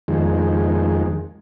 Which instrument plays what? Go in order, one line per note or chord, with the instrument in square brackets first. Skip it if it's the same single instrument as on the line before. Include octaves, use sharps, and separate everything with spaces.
[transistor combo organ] F2 D#3 G#3